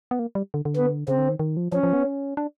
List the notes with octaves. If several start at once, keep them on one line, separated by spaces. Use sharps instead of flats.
B3
A#3
G3
D3
D3
B3
C#3 C4
D3
D#3
D#3
F3
F3 C#4
F3
B3
C#4
D4